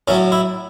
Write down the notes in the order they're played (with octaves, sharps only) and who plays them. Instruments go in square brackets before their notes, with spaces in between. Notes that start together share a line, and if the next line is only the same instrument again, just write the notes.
[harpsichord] A2 F#3 C#4
E4